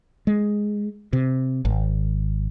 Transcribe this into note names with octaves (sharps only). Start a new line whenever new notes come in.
G#3
C3
G#1